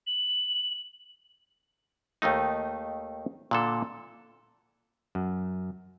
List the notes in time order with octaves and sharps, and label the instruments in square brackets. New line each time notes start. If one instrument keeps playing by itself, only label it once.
[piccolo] F#7
[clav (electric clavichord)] D#2 D#3 A3 D#4
A#2 D3 A4
F#2